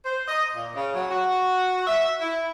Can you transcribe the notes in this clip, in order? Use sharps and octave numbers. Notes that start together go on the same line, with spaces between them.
C5
D#5
A#2
C#3
F#3
F#4
E5
E4